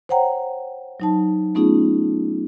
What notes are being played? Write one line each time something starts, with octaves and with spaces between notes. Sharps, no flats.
C5 C#5 F#5 G5 A#5
F#3 D#4 A5
A3 B3 C#4 D#4 F4 G#4